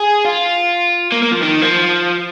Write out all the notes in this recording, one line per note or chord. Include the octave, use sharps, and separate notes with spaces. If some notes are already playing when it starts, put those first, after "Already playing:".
Already playing: G#4
F4
A#3
A#3
F3
D#3
F3